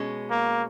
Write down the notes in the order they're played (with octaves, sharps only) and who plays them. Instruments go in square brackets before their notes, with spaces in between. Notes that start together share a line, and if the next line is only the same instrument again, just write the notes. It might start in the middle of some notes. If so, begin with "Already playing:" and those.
Already playing: [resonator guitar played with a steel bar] B2 G#3 C#4
[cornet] A#3